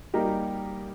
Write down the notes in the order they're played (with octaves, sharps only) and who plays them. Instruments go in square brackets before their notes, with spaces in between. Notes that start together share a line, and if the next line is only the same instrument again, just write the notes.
[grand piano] G3 A#3 D#4 G4 A#4